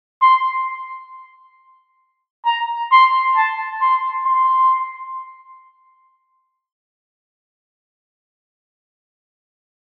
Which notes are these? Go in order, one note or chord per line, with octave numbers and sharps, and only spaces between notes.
C6
A#5
C6
A5
C6
C6